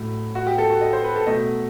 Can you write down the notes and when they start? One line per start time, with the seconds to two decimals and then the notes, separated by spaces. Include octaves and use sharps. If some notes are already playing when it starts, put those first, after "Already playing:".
Already playing: A2 F#3 A3
0.35 F#4
0.47 G4
0.58 A4
0.70 F#4
0.81 D#5
0.93 C5
1.04 B4
1.16 A4
1.27 B2 F#3 A3 D#5